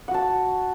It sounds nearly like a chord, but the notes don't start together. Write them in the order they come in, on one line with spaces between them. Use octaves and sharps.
F#5 F#4 A5